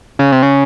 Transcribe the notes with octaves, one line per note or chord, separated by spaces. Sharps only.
C#3
C3
C#3